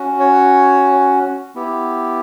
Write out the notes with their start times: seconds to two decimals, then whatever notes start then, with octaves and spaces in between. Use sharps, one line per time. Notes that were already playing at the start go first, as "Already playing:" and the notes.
Already playing: C#4 F#4
0.20 C#5
1.56 B3 E4 G4